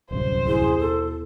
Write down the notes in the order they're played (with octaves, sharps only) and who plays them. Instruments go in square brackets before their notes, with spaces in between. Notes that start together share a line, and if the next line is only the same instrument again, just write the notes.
[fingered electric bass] D1 C2 F#2 [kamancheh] C5
[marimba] D#2 E4 [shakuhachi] G#4
[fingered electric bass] B2 [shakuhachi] A4